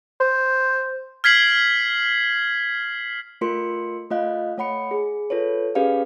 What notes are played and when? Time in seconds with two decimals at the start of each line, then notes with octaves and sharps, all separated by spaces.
0.20 C5
1.24 F6 G#6 B6 C7 F#7
3.41 A3 F4 A#4 C6 C#7
4.10 A3 F4 D#5 F5 F#6
4.57 A3 C#5 F#5 B5 C#7
4.91 G#4
5.30 F4 A4 B4 C#5
5.75 C#4 G4 G#4 B4 D5 F5